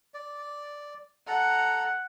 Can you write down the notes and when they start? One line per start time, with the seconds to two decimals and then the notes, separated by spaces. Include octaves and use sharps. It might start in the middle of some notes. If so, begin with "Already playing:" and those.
0.14 D5
1.27 A4 F#5 A#5